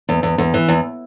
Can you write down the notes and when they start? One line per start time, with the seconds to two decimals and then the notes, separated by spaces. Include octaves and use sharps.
0.09 E2
0.23 E2
0.38 E2
0.54 E3
0.68 E2